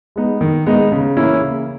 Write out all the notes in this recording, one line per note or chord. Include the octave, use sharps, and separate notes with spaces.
G#3 B3 D#4
D#3
G#3 B3 D#4
C#3
E3 A#3 C#4 E4
C#3